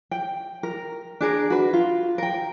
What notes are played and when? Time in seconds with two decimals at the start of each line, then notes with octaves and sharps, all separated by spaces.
0.11 G5
0.63 A#4
1.21 D4 G#4 A#4
1.50 F#4 B4
1.73 F4
2.18 A#4 G5